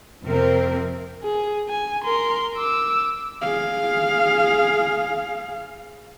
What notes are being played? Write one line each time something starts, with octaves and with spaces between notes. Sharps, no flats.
F2 C3 C4 A#4
G#4
G#5
A#4 C6
D6 E6
G#4 F5